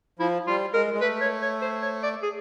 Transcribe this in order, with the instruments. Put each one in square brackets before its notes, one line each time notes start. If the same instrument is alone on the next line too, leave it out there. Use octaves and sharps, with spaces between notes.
[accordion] F3 [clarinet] E4
[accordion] G3 [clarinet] F4
[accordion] G#3 [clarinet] A#4
[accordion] G#3
[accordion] A3 [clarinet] B4
[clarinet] C#5
C#5
C5
C#5
D5
G#4